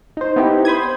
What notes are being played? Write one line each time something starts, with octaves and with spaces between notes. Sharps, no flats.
D#4 C5
B3 C4 D#4 E4 G4 B4
C5 B5 D#6 G#6